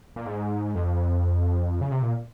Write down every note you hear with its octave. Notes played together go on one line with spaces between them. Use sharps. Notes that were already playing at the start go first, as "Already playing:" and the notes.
A#2
G#2
F2
C#3
C3
A#2